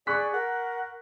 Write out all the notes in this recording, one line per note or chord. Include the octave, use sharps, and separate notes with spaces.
G#4 D5 C#6 F#6 B6
A#4 F#5